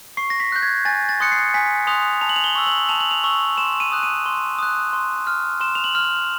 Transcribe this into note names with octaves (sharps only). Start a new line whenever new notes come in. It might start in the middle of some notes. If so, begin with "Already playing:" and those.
C#6 C7
A#6
B6
F#6 G6
G#6
G#5 A6
A6
C6 D#6 F#6 C#7
C7
G#5 B6
C6 D#6 F#6 F7
A5 F7
F#7
F7
G7
C#6 E6
F#7
A5 F7
F#7
F7
C#6 E6
C6 E7
D#7
D#6 F#6
D#7
C6
D#6 F#6
C6
F6
C6 E7
F7
F#7
F6